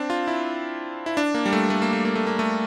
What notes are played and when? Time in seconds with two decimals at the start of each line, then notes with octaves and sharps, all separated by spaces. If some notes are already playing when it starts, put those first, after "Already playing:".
Already playing: C4 D4
0.10 F4
0.27 E4
1.06 E4
1.17 D4
1.34 A#3
1.46 G3
1.53 A3
1.70 A3
1.82 A#3
1.93 A3
2.05 A#3
2.15 A3
2.27 A#3
2.39 A3